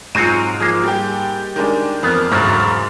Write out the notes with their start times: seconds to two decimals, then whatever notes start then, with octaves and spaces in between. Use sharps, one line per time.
0.15 G#2 F#3 G#3 C4 F4 F#4 D#7
0.60 F3 A#3 G#4
0.84 G3 G4
1.56 D#3 G#3 D4
2.03 F2 A#3 B3 F6
2.32 E1 D2 G#2 C#3 F#3 F6 A6